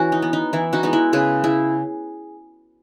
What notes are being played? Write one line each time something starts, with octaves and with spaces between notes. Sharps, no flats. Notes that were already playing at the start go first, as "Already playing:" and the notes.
Already playing: E3 C#4 F#4
D#4
B3
D#4
E3 E4
D#4 F#4
G#3 B3 D#4
E4
C#3 G#4 B4
E4 G#4